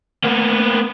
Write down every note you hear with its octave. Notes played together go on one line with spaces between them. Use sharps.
A#3 B3